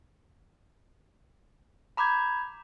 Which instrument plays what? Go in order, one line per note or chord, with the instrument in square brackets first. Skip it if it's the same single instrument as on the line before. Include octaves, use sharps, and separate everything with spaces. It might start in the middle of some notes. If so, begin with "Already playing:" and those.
[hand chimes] A#5 B5 D6 G6 G#6